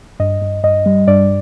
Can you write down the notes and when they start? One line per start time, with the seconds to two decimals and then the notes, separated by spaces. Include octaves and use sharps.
0.20 G2 D#5
0.41 G2
0.64 G2 D#5
0.86 G3
1.07 G2 D5